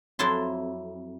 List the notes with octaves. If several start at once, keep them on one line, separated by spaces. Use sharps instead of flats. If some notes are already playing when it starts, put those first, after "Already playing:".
F2 F#3 E4 A5 C6